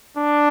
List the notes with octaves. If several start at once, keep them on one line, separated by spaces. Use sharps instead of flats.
D4